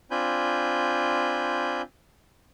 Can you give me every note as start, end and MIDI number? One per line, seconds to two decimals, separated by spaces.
0.11 1.82 60
0.11 1.82 62
0.11 1.82 65
0.11 1.82 80
0.11 1.82 83
0.11 1.82 91